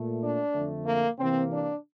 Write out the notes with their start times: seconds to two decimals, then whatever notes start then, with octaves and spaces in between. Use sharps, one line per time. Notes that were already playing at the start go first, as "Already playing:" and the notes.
Already playing: A#2 A3
0.21 D4
0.53 F2 D3 A3
0.86 A#3
1.19 C3 E3 A#3 C4
1.51 D4